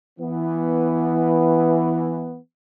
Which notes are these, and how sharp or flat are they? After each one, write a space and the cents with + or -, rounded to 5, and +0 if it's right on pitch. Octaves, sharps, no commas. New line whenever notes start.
E3 +0 B3 +0